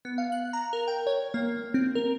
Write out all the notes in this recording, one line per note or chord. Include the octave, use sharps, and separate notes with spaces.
B3
F5
F#6
A#5
A#4
G5
C#5
A#3
C4
A#4